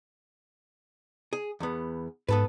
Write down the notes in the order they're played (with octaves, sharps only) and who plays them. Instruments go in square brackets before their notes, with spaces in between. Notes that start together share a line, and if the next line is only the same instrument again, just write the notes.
[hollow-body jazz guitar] G#4
E2 B3
[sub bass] G#2 [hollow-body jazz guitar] B3 A4 B4